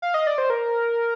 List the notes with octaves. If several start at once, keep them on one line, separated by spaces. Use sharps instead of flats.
F5
D#5
D5
C5
A#4